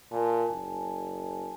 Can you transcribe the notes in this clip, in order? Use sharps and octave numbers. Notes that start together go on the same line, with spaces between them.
A#2 G#5 A5
F#1